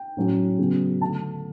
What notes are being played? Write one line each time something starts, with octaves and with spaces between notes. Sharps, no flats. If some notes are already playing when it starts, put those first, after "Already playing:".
Already playing: G5
A2 F#3 C#4
C#3 F#3 B3
D3 A3 A5